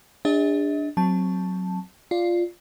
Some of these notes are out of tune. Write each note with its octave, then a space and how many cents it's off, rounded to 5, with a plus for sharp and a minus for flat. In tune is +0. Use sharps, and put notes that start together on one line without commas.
D4 +0 G#4 -40 D#5 +45
F#3 +0 C4 +0 A5 +0
F4 +0 D5 +5